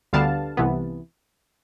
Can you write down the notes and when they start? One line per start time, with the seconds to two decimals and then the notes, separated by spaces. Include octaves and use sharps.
0.13 D2 D3 G3 B3 D4 F5 A5
0.57 C2 C3 E3 B3